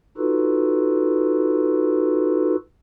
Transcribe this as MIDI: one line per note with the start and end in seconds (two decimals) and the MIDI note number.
0.18 2.56 63
0.18 2.56 65
0.18 2.56 66
0.18 2.56 69
0.18 2.56 71